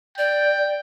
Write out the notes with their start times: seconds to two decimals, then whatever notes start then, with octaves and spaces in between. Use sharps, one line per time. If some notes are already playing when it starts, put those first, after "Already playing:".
0.18 D5 G5